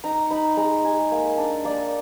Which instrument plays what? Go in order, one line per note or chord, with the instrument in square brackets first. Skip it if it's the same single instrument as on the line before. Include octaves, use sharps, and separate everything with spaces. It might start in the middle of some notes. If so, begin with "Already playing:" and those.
[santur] D#4 A#5
D#4 B5
G#3 A#5
G#3 G#5
A#3
D4
A#3 D5